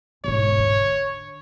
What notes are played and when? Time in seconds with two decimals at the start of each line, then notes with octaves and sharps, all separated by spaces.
0.24 E1 G#2 C#5
0.59 D3